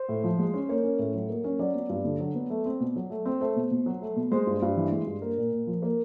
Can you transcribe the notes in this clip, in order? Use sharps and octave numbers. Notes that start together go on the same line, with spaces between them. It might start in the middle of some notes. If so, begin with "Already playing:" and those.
Already playing: C5
A2
F3
G#3
C#4
A#3 C#5
C#4
A2
F#3
A#3
C#4
F#3 D5
B3
G2
D3
F#3
B3
A3
C4
B2
F#3
A3
C4
A3 C5
B2
B2
F#3
A3
B2
G#3 C5
G2
G2
E3
G#3
G2
A#3 A#4
A#2
A#2
F3
A#3